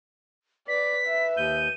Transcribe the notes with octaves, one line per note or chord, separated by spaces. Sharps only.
B4 D5 B6
E5
D#2 G6 D#7